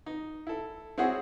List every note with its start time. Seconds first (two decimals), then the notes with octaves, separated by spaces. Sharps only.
0.06 D#4
0.47 E4 A4
0.98 C4 E4 F#4 G#4 C#5 F#5